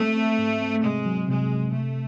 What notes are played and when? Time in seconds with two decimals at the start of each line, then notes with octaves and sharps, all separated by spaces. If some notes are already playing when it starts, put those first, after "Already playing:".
Already playing: A3 C4
0.16 C4
0.38 G#2
0.61 C4
0.83 C3 G#3
1.06 F#3
1.28 C3 G#3
1.51 C3
1.73 C3 A3